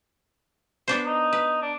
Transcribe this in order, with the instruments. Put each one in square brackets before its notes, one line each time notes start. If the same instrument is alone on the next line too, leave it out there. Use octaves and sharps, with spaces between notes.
[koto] B3 D4 C5
[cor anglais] D#4
[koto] B4
[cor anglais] D4